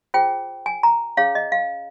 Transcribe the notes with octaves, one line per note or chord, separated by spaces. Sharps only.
F4 G#4 C5 G5
G#5
A#5
C#4 G#4 C#5 F5
D#5
F5